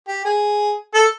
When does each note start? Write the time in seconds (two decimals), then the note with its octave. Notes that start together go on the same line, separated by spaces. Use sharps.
0.08 G4
0.25 G#4
0.94 A4